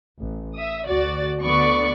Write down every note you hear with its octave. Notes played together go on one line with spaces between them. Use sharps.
A1
E5 D#6
D2 F#4 D5 A6
D2 D3 B3 D5 C#6